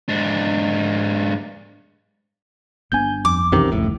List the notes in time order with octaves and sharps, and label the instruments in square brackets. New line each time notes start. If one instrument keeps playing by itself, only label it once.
[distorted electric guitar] G#2 D4
[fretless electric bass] G1 B3 D4 [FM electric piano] G#5 G6
[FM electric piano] F2 [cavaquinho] D6
[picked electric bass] B1 C3 D#3 [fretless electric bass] F#2 E3 C#4
[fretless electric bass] D1 G1 C#2 [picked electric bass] A2